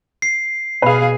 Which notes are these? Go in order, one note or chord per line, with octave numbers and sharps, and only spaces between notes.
C7
B2 G#4 B4 F5